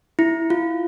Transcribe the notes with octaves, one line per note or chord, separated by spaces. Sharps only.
E4
F4